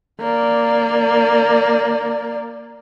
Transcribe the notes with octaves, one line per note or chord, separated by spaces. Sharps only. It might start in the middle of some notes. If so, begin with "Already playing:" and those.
A#3 D5